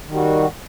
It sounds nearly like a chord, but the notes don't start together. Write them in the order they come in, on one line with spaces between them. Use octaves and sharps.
D#3 G3 F#4